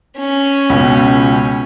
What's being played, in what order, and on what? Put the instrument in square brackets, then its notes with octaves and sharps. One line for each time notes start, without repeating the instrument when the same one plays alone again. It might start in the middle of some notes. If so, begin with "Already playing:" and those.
[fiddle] C#4
[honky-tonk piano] C#2 B2